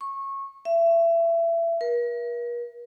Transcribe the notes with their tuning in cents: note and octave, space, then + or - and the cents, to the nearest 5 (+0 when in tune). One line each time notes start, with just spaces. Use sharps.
C#6 -20
E5 +25
A#4 +45